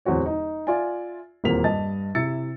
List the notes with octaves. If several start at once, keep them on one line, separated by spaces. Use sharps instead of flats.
D1 E2 C4 F#4 C#5
D#4
F4 D5 E5 G#5
D#1 E2 A#3 C4 B6 F7
G2 D#5 A5 A6
C3 E4 E6 A6 C#7